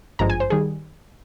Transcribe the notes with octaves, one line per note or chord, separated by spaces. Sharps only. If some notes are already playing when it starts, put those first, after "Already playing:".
G#1 G2 F3 G#3 A#5
G#5
C5
D#3 G3 G#4